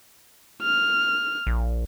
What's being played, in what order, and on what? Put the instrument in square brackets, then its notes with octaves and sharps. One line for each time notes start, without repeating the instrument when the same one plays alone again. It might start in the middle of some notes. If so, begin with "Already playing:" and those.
[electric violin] F6
[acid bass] A#1